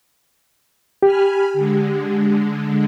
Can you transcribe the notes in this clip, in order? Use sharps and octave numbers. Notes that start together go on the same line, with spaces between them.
G4 G#5 B5 F6
D3 G#3